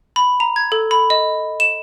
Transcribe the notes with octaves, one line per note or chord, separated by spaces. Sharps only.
B5
A#5
G#6
A4
B5
D#5
E7